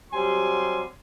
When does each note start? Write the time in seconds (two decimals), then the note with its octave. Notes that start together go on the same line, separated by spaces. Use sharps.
0.12 C3 F#3 G3 G#5 C6